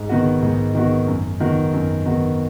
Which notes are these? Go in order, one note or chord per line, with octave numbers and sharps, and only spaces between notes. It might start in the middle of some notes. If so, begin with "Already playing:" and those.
Already playing: G#2
D#3 B3 F#4
G#2
D#3 B3 F#4
F#2
D#3 B3 F#4
F#2
D#3 B3 F#4